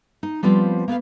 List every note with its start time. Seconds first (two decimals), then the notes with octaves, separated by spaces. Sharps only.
0.23 D#4
0.43 F3 G3 B3 C4 F4
0.88 A#3 B3 B4 F5